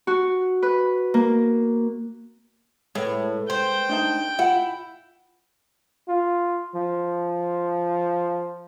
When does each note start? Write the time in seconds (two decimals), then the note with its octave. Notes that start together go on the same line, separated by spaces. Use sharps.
0.07 F#4
0.63 B4
1.14 A#3
2.95 A2 G#3 B4
3.50 C5 G5
3.89 D4 D#4 A5
4.39 E4 F4 F#5
6.09 F4
6.75 F3